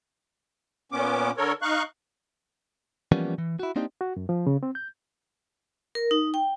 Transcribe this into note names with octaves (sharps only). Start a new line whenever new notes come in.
A#2 B3 C#4 D6
D3 A4 A#4 C#5
D#4 F5 C#6 F#6
E3 F3 G3 A#3 B3 C#4
E3
E4 F#4
A#3 C4 D4 D#4 G4
F#4
F#2
F3
C#3
C4
G6
A#4
D#4
G5